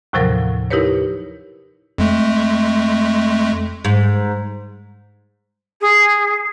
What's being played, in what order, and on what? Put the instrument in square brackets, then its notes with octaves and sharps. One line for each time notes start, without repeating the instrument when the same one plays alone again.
[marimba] D#2 A2 C3 F3 F#3 A#4
D#4 E4 G4 A#4 B4 C#5
[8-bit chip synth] F2 G#3 A3
[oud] G#2
[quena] G#4